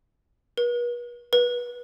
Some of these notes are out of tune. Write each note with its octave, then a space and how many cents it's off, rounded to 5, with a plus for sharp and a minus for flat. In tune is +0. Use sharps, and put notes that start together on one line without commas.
B4 -45
B4 -25